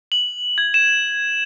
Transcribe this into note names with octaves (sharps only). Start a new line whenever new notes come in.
F#7
G#6
E7